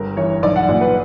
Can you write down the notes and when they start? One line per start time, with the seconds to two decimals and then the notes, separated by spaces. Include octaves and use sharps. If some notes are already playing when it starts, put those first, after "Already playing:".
Already playing: G1 A#4
0.17 E3 C#5
0.43 B1 D5
0.56 F#5
0.69 A#2 D5
0.81 B4